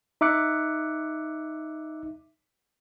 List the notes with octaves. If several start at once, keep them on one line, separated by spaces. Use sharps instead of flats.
D#4 E5 D6 F#6 C#7